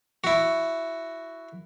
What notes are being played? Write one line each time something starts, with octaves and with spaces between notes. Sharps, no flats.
E4 F#4